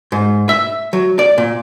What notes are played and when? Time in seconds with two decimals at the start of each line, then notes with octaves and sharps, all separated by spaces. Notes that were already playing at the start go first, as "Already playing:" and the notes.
0.12 G#2
0.49 E5
0.93 F#3
1.19 D5
1.38 A#2